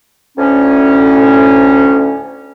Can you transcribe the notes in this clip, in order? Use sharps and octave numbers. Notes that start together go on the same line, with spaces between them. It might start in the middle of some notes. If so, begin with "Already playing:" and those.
D2 A2 C#4